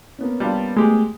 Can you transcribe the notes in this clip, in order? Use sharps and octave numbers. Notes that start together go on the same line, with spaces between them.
A#3 B3 C#4
G3 D4 F4
G#3 A3 G4 G#4